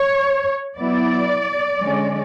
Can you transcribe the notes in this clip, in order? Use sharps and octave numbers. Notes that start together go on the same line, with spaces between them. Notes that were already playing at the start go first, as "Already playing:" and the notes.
Already playing: C#5
F#3 B3 E4 D5
D3 G#3 C#4